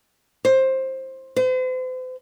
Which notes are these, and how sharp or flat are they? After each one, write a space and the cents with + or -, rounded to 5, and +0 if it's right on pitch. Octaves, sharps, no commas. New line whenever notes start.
C5 +15
C5 -40